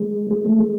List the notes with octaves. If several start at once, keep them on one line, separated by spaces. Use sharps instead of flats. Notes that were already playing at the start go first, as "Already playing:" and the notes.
Already playing: G#3
G#3
A3
G#3